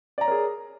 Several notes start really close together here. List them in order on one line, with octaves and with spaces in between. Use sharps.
D5 A#5 C#5 A#4 G#4